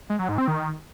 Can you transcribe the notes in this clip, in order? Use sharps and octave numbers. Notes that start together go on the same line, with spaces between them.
G#3
F#3
G#2
C4
D#3